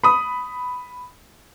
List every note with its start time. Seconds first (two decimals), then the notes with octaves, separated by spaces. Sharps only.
0.04 B5 D#6